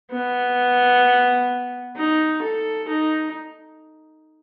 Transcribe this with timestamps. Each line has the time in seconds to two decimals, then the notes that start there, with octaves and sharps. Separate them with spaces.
0.12 B3
1.97 D#4
2.42 A4
2.88 D#4